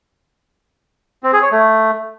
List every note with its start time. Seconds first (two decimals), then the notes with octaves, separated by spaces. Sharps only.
1.23 C4
1.33 G#4
1.42 C#5
1.52 A3